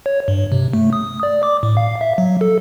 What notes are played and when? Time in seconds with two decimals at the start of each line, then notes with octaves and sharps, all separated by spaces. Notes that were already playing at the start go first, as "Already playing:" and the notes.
0.06 C#5
0.28 G2
0.52 C3
0.73 A3
0.93 D#6
1.23 D5
1.43 D6
1.63 A2
1.77 F5
2.01 E5
2.18 F#3
2.41 A4